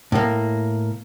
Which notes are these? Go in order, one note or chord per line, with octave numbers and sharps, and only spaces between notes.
A2 A#3